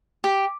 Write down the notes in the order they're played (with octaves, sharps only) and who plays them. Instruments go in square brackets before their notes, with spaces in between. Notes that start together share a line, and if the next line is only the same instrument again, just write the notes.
[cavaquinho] G4